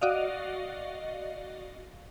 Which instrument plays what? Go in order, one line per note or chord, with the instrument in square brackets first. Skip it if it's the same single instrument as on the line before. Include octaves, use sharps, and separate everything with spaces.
[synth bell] F#4 D5 D#5 F5